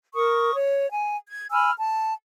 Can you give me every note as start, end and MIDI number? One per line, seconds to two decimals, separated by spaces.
0.14 0.54 70
0.14 0.54 85
0.14 0.54 87
0.55 0.89 73
0.91 1.16 80
1.28 1.45 92
1.51 1.71 80
1.51 1.71 83
1.51 1.71 88
1.51 1.71 89
1.79 2.13 81